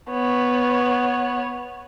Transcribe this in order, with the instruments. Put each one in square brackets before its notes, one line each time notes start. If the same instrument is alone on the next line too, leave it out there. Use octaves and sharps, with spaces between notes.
[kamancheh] B3 C#5